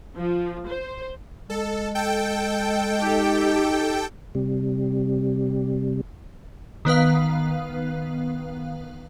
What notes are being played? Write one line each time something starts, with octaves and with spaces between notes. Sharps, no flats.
F3
C5
G#3 A4
A4 G5
D#4 G4
C3 G3
D#3 B3 B4 F5